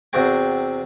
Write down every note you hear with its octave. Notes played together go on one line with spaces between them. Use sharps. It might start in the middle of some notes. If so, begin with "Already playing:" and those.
E2 C3 F#4 G5